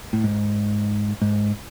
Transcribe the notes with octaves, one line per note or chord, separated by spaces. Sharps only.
A2
G#2
G#2